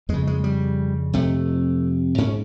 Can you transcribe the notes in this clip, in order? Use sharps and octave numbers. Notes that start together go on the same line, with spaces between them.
F2 C#3 G#3
G#3
G3
F2 C3 A3
G#2 C#4